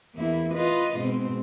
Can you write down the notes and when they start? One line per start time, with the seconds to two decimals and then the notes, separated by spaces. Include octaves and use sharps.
0.15 E2 A#3 E4
0.53 F4 B4 D#5
0.97 G#2 B2 C4